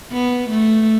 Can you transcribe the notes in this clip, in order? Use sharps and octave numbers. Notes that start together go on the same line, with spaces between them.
B3
A3